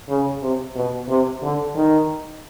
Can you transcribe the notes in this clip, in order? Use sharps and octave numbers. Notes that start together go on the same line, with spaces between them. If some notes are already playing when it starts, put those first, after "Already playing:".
C#3
C3
B2
C3
D3
D#3